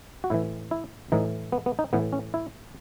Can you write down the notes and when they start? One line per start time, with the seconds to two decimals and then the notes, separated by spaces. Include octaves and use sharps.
0.24 F#4
0.30 A2 E3 E4
0.71 E4
1.12 A2 E3 D#4
1.52 B3
1.66 B3
1.79 D#4
1.93 A2 E3 B3
2.13 C#4
2.34 E4